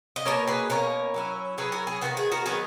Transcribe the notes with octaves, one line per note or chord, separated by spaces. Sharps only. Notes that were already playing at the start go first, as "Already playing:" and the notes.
D#5
B2 A#3 C#4 A#4 C#5
G#4 B4
B2 A#3 C#4 A#4 C#5
F#3 C#4 E4
F#3 C#4 E4 G#4 B4
F#4 A#4
G#4
D#3 F#3 B3 F#4
G#4
F#4 A#4
D#3 F#3 B3 G#4 B4